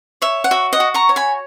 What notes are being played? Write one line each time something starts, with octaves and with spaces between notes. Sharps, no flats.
C#5 E5
F#5
F#4 E5
D#5 F#5
F#4
A#5 C#6
C#5
G#5 B5